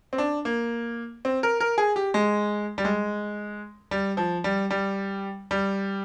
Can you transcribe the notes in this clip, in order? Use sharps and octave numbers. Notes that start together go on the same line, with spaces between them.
C4
D4
A#3
C4
A#4
A#4
G#4
G4
G#3
G3
G#3
G3
F3
G3
G3
G3